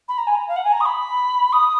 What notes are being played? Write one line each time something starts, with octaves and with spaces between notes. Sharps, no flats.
B5
A#5
G#5
A#5
F5
F#5
G#5
A#5
D#6
B5
D#6